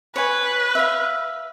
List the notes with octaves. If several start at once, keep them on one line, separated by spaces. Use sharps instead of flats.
B4 C#5 G#5
E5 F5